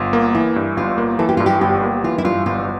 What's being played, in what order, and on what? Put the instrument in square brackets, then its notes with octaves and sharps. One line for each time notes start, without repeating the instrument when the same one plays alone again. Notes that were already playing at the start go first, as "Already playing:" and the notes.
Already playing: [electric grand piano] G1 [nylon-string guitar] F4
[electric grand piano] A#3
[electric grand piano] E3 [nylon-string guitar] E4
[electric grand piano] G2
[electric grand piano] G1 [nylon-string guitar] F4
[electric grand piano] A#3
[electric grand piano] E3 [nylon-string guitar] A4
[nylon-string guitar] G4
[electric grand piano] G2 [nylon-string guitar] F4
[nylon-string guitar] G4
[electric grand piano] G1 [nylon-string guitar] G4
[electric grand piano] A#3
[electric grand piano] E3 [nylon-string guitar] F4
[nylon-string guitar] E4
[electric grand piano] G2 [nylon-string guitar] F4
[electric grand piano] G1 [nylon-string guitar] F4